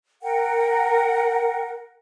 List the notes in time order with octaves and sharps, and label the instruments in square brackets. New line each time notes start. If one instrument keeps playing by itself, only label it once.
[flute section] A#4 F#5 G5